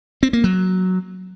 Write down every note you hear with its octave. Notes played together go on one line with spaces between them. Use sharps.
C4
A#3
F#3